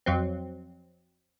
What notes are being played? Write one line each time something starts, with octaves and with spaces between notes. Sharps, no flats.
F2 F#3 C4